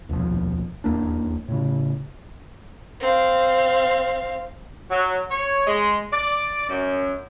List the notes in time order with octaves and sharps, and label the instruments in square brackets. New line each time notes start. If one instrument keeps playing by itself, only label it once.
[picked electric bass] D#1 B1 F2 F3
D#1 E2 A#3 D4
A2 C#3
[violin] C4 F5
[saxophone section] F#3
C#5
G#3
D5
F#2